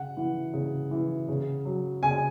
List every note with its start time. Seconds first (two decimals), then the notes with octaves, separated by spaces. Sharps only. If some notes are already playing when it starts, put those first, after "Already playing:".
Already playing: C#3 F#5
0.17 E3
0.54 C#3
0.91 E3
1.29 C#3
1.65 F#3
2.03 C#3 G#5